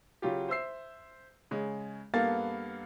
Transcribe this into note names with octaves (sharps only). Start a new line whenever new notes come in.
C#3 F#3 F4 G4
C5 E5 E6 C7
C#3 G#3
G2 A#3 B3 A4 F5 A6